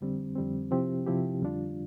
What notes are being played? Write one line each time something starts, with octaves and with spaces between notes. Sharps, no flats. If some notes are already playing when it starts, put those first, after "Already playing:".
F2 D3 G3 C4
F2 D3 G3 C4
C3 F3 C4 E4 G4
C3 F3 C4 E4 G4
F2 D3 G3 D4 F4